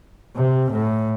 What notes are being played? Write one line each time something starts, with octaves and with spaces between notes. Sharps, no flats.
C3
A2